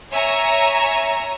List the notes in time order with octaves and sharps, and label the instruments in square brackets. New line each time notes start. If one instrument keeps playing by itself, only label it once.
[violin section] C#5 E5 G#5 A#5